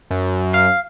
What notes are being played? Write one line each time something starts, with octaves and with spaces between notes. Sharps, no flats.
F#2
F5